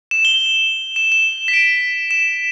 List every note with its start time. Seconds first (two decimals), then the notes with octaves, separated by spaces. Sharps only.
0.11 E7
0.25 G7
0.96 E7
1.12 E7
1.48 B6
1.53 D7
2.11 E7